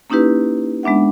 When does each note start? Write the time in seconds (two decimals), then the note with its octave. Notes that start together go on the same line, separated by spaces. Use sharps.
0.10 A#3 C#4 D#4 E4 G4 B4
0.83 G#3 B3 D4 E5 F#5